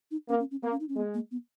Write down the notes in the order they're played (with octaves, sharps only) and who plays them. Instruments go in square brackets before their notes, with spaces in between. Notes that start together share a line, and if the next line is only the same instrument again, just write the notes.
[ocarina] D#4
[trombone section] A#3 [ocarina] C#4
[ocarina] C#4
C#4
[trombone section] A#3 [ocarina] B3
[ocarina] C#4
D#4
C#4
[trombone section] G#3 [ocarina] B3
[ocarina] A#3
B3